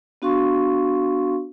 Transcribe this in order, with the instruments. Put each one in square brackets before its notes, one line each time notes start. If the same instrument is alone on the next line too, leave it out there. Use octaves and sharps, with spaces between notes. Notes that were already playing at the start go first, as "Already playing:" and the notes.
[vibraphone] B3 D4 F#4 F5 C6 C#6